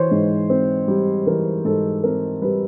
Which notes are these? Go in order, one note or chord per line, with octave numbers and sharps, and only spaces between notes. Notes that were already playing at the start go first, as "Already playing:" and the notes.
Already playing: E3 C5 C#5
G#2
C4
G3
E3 A#4
G#2 A4
C4 A#4
G3 B4